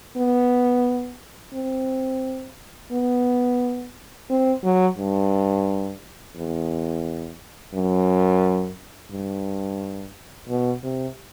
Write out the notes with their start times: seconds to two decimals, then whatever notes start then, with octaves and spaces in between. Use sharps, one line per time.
0.17 B3
1.54 C4
2.92 B3
4.30 C4
4.64 F#3
4.98 G2
6.36 E2
7.74 F#2
9.11 G2
10.49 B2
10.83 C3